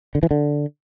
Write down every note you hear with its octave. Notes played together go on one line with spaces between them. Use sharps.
D3
E3
D3